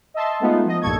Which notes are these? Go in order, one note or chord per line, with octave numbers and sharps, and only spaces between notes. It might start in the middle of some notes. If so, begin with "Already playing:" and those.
D#5 E5 A5 C6
G#3 A3 B3 D#4 F4
F3 D#5
B1 G2 A#2 A4 C#6 G#6